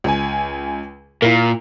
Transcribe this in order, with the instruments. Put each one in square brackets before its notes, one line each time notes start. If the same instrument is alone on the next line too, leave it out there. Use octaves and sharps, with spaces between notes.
[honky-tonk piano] C#2 G#5
[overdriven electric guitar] A#2 [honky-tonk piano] E4 A#4